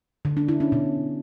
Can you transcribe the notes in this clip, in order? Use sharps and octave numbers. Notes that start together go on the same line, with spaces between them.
D3
D4
E4
C#4
B2